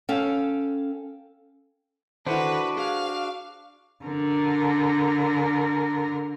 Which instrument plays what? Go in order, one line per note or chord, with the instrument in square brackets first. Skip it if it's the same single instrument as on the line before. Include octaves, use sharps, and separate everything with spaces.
[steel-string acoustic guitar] C#4 A4 F5 G5
[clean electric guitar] D#3 A4 F#5 [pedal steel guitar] D4 F#4 [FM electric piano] E4 C5 [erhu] B4
[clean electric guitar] G#4 [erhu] F5
[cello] D3 A#4